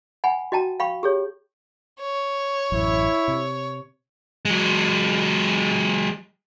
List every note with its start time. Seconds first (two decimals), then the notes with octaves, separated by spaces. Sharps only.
0.24 F#5 G#5 B5
0.52 F#4 D#5 G5 A5 A#5
0.80 F5 G5 B5 C#6
1.03 G4 G#4 C#5
2.01 C#5
2.72 A1 F#2 E4
3.28 C3
4.45 F#3 G#3